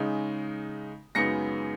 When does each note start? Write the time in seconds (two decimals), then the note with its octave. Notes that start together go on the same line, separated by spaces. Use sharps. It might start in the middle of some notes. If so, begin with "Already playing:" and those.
Already playing: C#3 G#3 D#4
1.15 F#2 C#3 G#3 B3 D#4 A#6 C#7